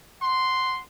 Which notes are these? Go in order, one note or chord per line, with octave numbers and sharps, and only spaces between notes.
F#5 C6